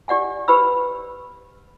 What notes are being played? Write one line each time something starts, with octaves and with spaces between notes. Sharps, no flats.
G4 D5 F#5 G#5
G4 B4 C5 B5 E6